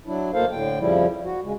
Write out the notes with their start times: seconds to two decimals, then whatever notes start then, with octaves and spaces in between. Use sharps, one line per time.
0.06 F#3 D4 E4
0.33 D2 B2 A#3 A4 C5 F5
0.51 A2 D3 G5
0.79 F2 C#3 F3 G3 E4
1.24 F#4
1.43 C#3 G#3